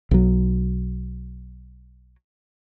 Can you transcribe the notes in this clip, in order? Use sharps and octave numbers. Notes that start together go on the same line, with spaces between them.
B1 F#3